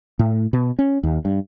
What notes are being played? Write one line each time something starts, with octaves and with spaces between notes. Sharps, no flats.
A2
B2
C#4
D#2
G2